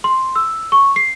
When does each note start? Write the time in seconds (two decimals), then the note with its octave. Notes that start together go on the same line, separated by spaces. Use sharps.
0.04 C6
0.36 E6
0.72 C#6
0.96 C7